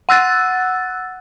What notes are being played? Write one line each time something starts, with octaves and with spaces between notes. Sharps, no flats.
F#5 E6 F#6 A6